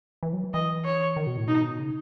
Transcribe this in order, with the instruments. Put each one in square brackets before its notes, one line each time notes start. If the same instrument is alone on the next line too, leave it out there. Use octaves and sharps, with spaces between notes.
[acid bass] E3
F#3
[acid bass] E3 [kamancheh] D#5
[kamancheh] C#5
[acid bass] D#3
B2
A2
[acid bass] B2 [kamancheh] D#4
[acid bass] C#3